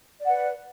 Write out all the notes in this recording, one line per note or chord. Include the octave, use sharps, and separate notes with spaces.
B4 D5 F#5